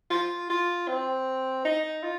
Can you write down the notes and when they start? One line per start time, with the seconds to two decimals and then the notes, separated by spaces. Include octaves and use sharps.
0.11 F4
0.50 F4
0.88 C4
1.65 D#4
2.03 F4